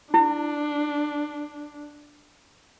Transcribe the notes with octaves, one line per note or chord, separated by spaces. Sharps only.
D4 E4